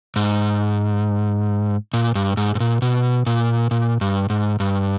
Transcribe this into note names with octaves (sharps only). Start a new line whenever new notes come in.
G#2
A#2
G2
G#2
G#2
A#2
B2
A#2
A#2
G2
G#2
G2